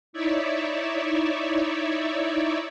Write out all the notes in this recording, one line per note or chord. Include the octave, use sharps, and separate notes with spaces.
D#4 E4 C#5 D5 E5